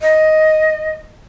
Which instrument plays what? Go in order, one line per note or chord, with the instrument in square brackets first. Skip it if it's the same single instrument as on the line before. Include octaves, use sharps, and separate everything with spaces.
[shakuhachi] D#5